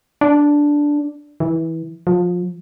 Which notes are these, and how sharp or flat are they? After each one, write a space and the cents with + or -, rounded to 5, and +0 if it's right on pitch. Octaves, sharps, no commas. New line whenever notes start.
D4 -5
E3 -20
F3 +25